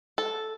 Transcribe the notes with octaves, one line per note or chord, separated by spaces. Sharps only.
A4